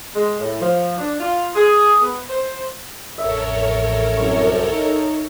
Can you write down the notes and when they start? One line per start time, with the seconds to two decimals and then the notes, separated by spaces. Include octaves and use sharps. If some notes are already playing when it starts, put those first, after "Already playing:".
0.14 G#3
0.40 A2
0.60 F3
0.98 D4
1.19 F4
1.55 G#4
2.02 B3
2.29 C5
3.18 A1 F2 A4 A#4 C#5 E5
4.17 C2 F#2 C#6
4.72 D#4